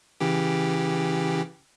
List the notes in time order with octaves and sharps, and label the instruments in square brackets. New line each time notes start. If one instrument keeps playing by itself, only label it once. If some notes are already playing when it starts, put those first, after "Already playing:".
[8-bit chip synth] C#3 E3 G4